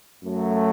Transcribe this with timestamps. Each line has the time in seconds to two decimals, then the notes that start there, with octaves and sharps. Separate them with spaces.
0.23 F#2 F#3 A3